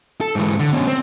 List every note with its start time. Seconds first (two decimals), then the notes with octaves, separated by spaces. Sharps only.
0.21 A4
0.36 G#2 E3
0.59 D3
0.73 B2 C#4
0.88 C4